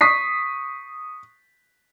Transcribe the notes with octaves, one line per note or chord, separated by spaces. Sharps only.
C#6 D#6 B6 C7